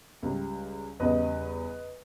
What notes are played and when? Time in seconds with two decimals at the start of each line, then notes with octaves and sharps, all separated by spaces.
0.23 C#2 C#3 G3
1.00 E2 C#3 G3 B4 D#5